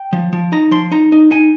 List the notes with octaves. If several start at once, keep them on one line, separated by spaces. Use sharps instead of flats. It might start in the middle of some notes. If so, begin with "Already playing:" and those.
Already playing: G5
F3
F3
D#4 A#5
F3 C6
D#4 A#5
D#4
D#4 G#5